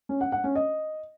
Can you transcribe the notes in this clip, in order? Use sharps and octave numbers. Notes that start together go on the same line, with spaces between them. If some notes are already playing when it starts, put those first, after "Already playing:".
C#4
F#5
F#5
C#4
D#5